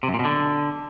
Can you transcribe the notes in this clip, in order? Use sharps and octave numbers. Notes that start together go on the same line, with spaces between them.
C3
F#2
A#2
B2
D3